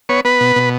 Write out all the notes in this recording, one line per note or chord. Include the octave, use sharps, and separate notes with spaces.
B3 C#5
B3 B4
B2
B2